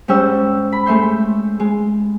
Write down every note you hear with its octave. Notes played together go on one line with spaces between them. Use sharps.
G#2 G3 C#4 G5 E6
B5
G#3 A3 E5 C6 G6
G#3